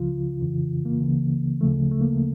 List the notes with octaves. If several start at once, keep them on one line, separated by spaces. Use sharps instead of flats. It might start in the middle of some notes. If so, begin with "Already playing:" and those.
Already playing: C#2 C#3 F3 F4
F2 C#3 E3
A#3
C#2 C#3 E3
D2 C#3 F3 A3
A3
A#3